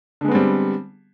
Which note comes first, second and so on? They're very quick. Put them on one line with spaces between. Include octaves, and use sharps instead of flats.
D3 G#3 B3 C4 G3